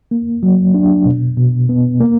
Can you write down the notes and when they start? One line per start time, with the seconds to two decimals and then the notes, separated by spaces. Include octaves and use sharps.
0.11 A#3
0.43 F#3
0.74 D4
1.05 B2
1.37 B2
1.69 B3
2.00 A#3